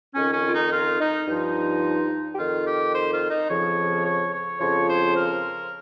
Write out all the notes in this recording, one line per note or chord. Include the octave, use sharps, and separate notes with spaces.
F2 D#3 C#4
C#4
F4
D#4
F4
D#4
G2 F3 D#4
G4
F2 D#3 F4
G4
C5
F4
D#4
F2 C#3 F3 C#5
C#5
C#5
F2 C#3 F3 C#5
C5
A#4